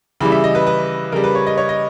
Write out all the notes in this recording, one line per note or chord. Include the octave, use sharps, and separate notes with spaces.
C#3 E3 G3 B5
E5
D#5
B4
B4
C#3 G3 A#4
B4
C#5
D#5
C#5
D#5